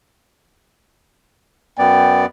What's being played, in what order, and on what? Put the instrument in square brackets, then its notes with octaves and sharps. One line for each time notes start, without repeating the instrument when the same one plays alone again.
[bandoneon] F#2 B3 D5 [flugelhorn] G5